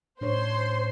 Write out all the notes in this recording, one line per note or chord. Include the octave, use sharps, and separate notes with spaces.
A2 C#4 D4 C5 C#5 C6